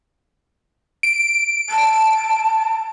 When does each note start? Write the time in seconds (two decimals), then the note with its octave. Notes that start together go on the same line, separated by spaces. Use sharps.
1.03 D7
1.69 A5